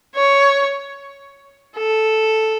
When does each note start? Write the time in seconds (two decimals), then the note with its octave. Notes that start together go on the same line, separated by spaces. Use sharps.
0.15 C#5
1.77 A4